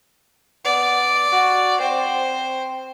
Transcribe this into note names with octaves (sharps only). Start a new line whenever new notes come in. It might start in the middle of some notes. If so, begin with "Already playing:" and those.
B3 D5
F#4
C4 C5